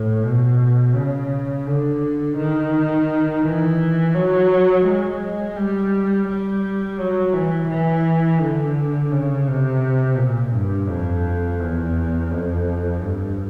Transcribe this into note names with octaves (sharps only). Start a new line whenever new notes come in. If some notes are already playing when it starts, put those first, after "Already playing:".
Already playing: A2
B2
C#3
D3
D#3
E3
F#3
G#3
G3
G3
F#3
E3
E3
D3
C#3
C3
A#2
G2
F2
E2
F2
G2